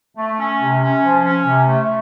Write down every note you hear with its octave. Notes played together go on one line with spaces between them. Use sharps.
A3
C#4
C3
C#4
F3
C#4
C3
A3